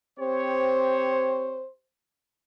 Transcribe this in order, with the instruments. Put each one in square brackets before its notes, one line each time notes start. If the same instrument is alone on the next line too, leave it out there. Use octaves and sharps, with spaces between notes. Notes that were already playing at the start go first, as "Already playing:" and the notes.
[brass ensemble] C4 G4 C#5 [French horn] C5